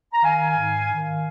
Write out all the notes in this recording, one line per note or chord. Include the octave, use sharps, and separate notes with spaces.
A#5
D#3 F5 G#5
G#2
D#3